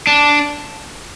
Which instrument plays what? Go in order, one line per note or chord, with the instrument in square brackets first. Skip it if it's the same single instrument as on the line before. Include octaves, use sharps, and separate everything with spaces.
[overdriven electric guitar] D4